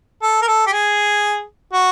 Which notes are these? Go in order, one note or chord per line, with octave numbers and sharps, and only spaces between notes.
A4
A#4
A4
G4
G#4
F#4